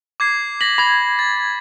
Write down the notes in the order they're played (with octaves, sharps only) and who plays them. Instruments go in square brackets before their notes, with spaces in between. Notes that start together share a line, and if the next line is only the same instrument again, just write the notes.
[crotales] D6 G#6 C7
[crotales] A#6 B6 [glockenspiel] F#7
[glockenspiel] B5 G#6 [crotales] A#6
[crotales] A6